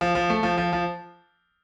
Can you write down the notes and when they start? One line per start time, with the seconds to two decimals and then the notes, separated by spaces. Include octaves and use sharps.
0.01 F3
0.15 F3
0.30 A3
0.43 F3
0.57 F3
0.73 F3